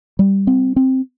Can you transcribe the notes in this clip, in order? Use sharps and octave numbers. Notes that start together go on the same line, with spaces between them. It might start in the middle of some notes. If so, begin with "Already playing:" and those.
G3
C4
C4